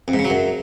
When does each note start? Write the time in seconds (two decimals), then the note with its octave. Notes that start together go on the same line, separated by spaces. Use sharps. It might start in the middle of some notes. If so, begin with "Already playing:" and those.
0.08 F2
0.13 G#2
0.19 C#3
0.25 F#3
0.30 F#2